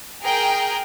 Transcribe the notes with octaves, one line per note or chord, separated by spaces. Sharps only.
G#4 A#4 G5